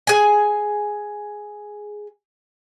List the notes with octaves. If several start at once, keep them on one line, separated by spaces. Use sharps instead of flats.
G#4 G#5